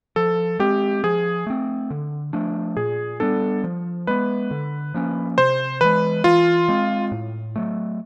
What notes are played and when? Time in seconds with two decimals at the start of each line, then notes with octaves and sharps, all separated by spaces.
0.16 F3 A4
0.59 G#3 C4 G4
1.04 F3 G#4
1.47 A3 C4
1.90 D3
2.33 F3 A3 D4
2.77 A#2 G#4
3.20 G3 B3 D4 A4
3.64 F3
4.07 G#3 B3 B4
4.51 D3
4.94 F3 A#3 C#4
5.38 C3 C5
5.81 E3 G#3 B4
6.24 E3 F4
6.68 G#3 C4
7.12 A2
7.56 F#3 A3